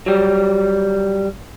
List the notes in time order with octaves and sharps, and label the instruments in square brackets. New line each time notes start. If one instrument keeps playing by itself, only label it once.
[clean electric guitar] F#3 G3